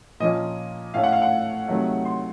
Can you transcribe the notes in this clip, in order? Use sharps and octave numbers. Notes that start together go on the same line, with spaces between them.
A#2 F3 A#3 C#4 D#5
A2 A3 C#4 F5
F#5
F5
F#5
C3 D#3 F#3 A3
C6